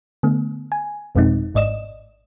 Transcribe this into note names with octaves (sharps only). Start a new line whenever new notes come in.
D3 A3 B3
G#5
G1 F2 B2 G#3 C4 D#4
G#1 G#2 D5 D#5 E7